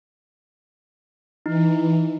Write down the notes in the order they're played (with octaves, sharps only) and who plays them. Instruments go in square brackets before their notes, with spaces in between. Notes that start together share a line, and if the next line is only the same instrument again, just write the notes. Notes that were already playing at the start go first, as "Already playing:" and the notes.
[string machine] E3 [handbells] D#4